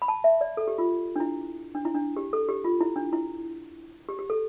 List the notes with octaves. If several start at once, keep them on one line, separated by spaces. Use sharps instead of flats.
B5
A5
E5
D5
A4
G4
F4
D4
E4
D4
E4
D4
G4
A4
G4
F4
E4
D4
E4
G4
G4
A4